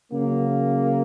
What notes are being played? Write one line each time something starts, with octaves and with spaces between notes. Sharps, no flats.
C#3 F#3 A#3